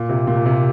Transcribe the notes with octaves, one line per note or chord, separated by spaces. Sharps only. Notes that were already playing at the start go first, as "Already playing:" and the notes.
Already playing: A#2
C3
A#2
C3